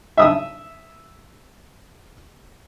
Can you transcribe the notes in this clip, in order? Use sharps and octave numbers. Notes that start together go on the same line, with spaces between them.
E5 D#6 E6